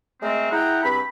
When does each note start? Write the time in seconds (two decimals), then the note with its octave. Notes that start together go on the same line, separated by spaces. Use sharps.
0.21 G#3 A3 C4 A#4 D#5
0.51 E4 G#4 F#5 G5 A#5
0.83 G2 C4 B5